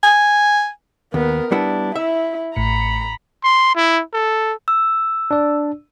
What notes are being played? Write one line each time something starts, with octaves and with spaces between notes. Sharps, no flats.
G#5
D#2 B3 A#4
G3 B3 D4 E4
E4 E5
A1 A2 A#5 B5 C#7
C6
E4
A4
E6
D4 D5